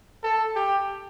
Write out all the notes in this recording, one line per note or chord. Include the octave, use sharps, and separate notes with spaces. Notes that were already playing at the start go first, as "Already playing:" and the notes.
A4
G4